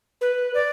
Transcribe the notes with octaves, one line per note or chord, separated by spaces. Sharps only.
B4
D5